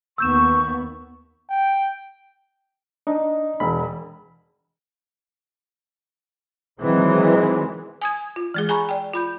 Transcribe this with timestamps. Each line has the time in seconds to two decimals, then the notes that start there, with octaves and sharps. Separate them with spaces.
0.18 D#2 B3 C#6 E6 G6 E7
1.50 G5
3.07 D4 D#4
3.60 E1 B5
6.80 D#3 E3 F#3 G#3 C4
8.02 G#5 D#6 G#6
8.36 F4
8.54 E3 G#3 G#4
8.69 G#4 G#5 A#5 B5 C#6
8.89 D5 G5
9.14 F4 B5 G6